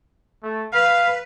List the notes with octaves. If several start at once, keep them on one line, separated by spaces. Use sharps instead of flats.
A3
B4 F5